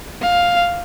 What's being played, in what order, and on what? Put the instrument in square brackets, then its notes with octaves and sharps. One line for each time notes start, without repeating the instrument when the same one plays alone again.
[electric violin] F5